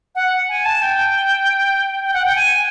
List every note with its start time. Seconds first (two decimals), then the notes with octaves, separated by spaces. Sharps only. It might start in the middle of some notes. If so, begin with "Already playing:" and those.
0.15 F#5
0.49 G#5
0.65 A5
0.82 G5
2.04 G5
2.14 F#5
2.26 G5
2.36 G#5